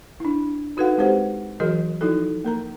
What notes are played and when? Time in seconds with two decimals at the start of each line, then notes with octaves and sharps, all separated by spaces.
0.20 D4 E4
0.77 D#4 F#4 A4 B4 F5 F#5
0.98 G#3 C4 G4 B4 C5 F#5
1.60 E3 F#3 F#4 G#4 A#4 D#5
2.01 F3 D#4 E4 F#4 A4
2.45 A#3 A#4 A#5